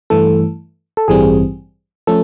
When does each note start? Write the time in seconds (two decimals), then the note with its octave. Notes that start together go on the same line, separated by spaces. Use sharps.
0.10 G2 E3 A3 A4
0.97 A4
1.08 A1 G2 E3 G3 C4 G#4
2.07 F3 A3 C#4 A4